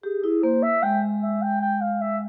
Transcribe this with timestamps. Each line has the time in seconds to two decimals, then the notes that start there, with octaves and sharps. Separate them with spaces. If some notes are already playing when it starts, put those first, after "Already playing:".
0.03 G4 G#4
0.23 E4 G#4
0.43 A#3 C5
0.62 E5
0.83 G#3 G5
1.22 E5
1.42 G5
1.61 G5
1.81 F5
2.01 E5